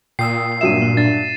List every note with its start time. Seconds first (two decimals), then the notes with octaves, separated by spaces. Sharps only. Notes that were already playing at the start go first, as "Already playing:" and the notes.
0.19 A#2 G5 D#6 E6 C7
0.61 G2 F#3 E5 D#7 E7
0.82 A#3
0.97 D4 A6